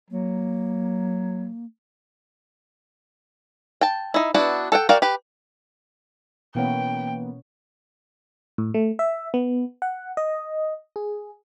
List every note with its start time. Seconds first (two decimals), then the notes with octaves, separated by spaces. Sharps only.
0.11 F#3 A#3
3.81 G5 A5
4.14 D#4 E4
4.34 B3 D4 E4 F#4 B4
4.72 A4 F#5 G5
4.89 F#4 A#4 D5 F5 G5
5.02 G4 B4
6.55 B2 E3 A#3 B3 C#4 C#5 G5
8.58 A2
8.74 A3
8.99 E5
9.34 B3
9.82 F#5
10.17 D#5
10.96 G#4